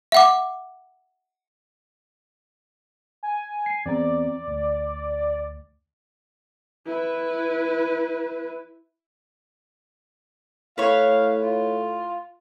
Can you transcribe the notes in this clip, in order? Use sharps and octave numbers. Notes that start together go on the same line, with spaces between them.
E5 F#5 D6
G#5
C7
E2 C4 D5 A#5
D2
E4 B4
A2 B4 C#5 F5
F4